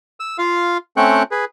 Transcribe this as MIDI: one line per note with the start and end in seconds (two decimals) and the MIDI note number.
0.20 0.37 88
0.38 0.78 65
0.38 0.78 77
0.97 1.23 57
0.97 1.23 60
0.97 1.23 61
0.97 1.23 79
0.97 1.23 85
0.97 1.23 90
1.31 1.45 68
1.31 1.45 71